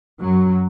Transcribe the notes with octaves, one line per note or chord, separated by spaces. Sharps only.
F#2 F#3